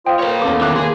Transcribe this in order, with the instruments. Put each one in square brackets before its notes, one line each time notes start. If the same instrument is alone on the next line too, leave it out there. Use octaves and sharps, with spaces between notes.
[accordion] F4 C5 D#5 [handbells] G5
[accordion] A#3 [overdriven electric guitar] B4 C#5
[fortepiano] E2 C#4 A4 [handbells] D6
[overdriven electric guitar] D#3 E5 [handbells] B3 D6 F#6
[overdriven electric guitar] G#4 [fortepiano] C6